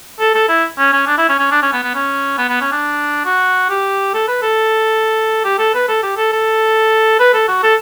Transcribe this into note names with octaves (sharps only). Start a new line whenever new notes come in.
A4
A4
E4
C#4
C#4
D4
E4
C#4
C#4
D4
C#4
B3
B3
C#4
B3
B3
C#4
D4
F#4
G4
A4
B4
A4
G4
A4
B4
A4
G4
A4
A4
B4
A4
F#4
A4